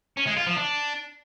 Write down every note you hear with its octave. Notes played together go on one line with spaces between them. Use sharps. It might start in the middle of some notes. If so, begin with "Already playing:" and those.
C#4
G#3
F4
F3
D4